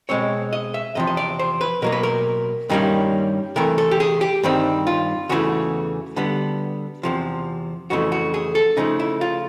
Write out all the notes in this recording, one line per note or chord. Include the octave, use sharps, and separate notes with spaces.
B2 G#3 C4 C#5
D#5
E5
E2 C3 F3 D#5
D#5
D5
C5
B4
B2 F#3 A#3 A#4
B4
A#4
G2 D#3 G3 A#3 C#4
C3 E3 A3 A#4
A4
G4
G#4
G4
G2 D#3 G3 C4
F4
E2 C#3 E3 A3 F#4
D3 G3 B3
E2 C3 F3
F2 C#3 E3 A3 F#4
F#4
G#4
A4
C#3 F3 A3 D#4
E4
F4